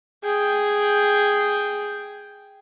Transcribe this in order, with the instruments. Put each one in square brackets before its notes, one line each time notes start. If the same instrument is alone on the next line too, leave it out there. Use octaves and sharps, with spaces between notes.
[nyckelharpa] G#4 G5